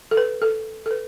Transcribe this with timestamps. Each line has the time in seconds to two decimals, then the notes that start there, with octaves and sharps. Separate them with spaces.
0.11 A4
0.17 B4
0.42 A4
0.86 A4
0.91 B4